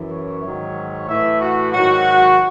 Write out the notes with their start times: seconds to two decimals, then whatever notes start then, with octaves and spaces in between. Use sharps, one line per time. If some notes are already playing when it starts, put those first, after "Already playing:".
Already playing: F#2 E3
0.12 C#5
0.44 G#2 D#3 F#3
1.08 A2 E3 E5
1.41 F#4
1.74 G#2 D#3 F#3 F#4